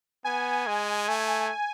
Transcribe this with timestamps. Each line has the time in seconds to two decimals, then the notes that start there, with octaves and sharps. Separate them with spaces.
0.24 B3 G#5
0.67 G#3
1.08 A3